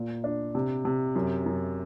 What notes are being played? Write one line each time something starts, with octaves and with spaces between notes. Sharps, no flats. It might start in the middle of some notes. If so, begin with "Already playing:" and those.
Already playing: A#2
D4
C3
C3
F#2
F#2